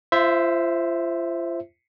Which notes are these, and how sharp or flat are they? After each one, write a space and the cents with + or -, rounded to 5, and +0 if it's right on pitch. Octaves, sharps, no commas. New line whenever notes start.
F4 -35 C5 +0 E5 +0